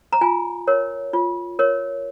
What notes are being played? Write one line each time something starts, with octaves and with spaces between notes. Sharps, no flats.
A#5
F4 G#5
A#4 C#5
F4
A#4 C#5